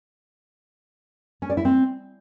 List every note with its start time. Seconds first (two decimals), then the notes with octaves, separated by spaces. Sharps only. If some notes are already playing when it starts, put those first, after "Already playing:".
1.42 C#4
1.50 D5
1.57 E4
1.65 C4